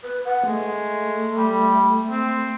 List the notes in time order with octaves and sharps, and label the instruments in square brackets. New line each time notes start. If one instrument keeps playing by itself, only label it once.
[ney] B4
F#5
[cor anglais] G#3 [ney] A3
[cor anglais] G3
C4